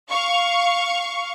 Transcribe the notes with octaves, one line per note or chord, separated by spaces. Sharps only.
F5 C#6